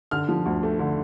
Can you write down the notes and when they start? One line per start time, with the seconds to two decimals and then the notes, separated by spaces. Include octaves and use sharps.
0.11 D3 F6
0.28 F3
0.46 D2
0.63 A3
0.79 D3